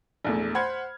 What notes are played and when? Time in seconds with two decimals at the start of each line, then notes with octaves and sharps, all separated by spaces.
0.25 A#1 E2 A3
0.55 C5 F#5 B5 F6 G#6